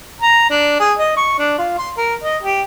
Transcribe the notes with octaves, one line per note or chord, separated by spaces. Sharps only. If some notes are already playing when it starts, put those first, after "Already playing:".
A#5
D4
G#4
D#5
C#6
D4
F4
C6
A#4
D#5
G4